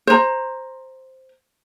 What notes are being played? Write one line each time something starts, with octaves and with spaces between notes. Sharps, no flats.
C5 A#5